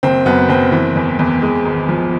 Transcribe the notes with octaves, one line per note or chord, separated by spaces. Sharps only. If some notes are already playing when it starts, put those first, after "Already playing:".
F#1 C4
F#2 B3
F#1 C4
E3
E2
E2
G#3
G#1
F3